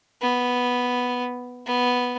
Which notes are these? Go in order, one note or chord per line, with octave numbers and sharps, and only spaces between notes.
B3
B3